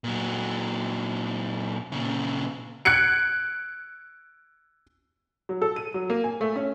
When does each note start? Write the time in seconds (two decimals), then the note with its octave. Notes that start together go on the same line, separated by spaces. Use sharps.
0.04 A#2 F#3
1.92 A#2 C#3
2.85 F#6 G#6 C#7 D7
5.49 F#3
5.62 A4
5.76 D#7
5.94 F#3
6.10 A#3
6.24 G#5
6.41 A3
6.56 C#4